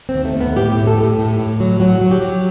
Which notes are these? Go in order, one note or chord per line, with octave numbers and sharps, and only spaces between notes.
C4
D#2
A3
D#2
B3
A2 G4
A2 G4
A4
A2
G4
A2
A2
F#3
F#3 F#4
F#3
G4
F#3